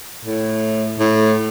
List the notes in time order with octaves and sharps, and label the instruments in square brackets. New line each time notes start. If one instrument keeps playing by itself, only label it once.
[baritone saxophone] A2
A2